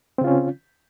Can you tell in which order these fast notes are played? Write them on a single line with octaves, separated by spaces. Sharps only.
C4 C#3 F4 C#4